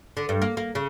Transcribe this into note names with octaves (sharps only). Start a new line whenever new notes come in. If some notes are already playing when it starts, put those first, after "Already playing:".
D3
G2
A#3
A#3
C#3